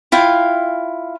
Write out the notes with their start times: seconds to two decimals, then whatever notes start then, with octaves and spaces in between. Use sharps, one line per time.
0.12 E4 F4 F5 G5